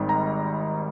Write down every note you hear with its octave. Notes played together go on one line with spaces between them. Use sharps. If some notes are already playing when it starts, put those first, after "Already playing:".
Already playing: G#1 G#2 G3
A#5